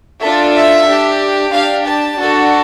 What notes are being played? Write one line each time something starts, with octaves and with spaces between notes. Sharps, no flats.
D4 F4 A4 E5
E5
D4 G4
D4 G4 F5
A5
D4 F#4 A4